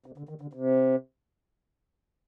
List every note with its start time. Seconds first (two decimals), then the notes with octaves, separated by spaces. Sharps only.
0.06 C3
0.18 D3
0.29 D#3
0.41 D3
0.53 C3